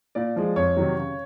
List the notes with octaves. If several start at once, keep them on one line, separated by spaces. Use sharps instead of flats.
A#2 D5
F3 G#3
F2 C#5
C3 D#3 F#3
C#3